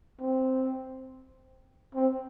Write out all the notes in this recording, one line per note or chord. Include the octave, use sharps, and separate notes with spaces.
C4
C4